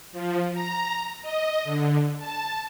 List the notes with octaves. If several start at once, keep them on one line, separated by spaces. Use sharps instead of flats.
F3
A#5
D#5
D3
A5